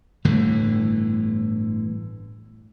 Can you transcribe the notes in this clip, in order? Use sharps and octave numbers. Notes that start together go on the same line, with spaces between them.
G1 A2 D3 E3